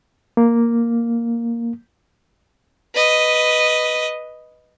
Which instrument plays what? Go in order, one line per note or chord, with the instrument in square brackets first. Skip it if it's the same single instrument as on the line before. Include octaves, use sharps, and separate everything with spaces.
[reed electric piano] A#3
[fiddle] B4 D#5